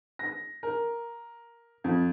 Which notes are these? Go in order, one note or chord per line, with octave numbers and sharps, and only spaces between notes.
A#6
A#4
F2